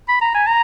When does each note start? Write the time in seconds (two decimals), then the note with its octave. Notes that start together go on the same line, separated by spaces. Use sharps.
0.09 B5
0.21 A#5
0.35 G#5
0.47 A#5